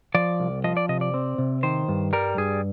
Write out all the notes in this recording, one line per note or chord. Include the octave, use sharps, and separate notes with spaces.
F3 D5
C2
F3 D#5
D5
C3 D#5
D5
C4
C3
D#3 C5
G2
G3 A#4
G2 G#4